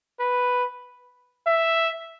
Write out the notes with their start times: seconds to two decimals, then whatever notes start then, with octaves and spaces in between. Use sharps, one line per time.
0.20 B4
1.47 E5